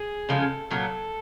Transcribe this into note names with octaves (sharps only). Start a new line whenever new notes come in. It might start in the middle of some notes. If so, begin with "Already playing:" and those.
Already playing: G#4
C#3 F3 G#3 C#4 A4
A#2 F#3 B3 A4